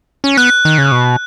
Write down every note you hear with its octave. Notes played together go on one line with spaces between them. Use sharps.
C#4
B3 F#6
D#3
C#3
B2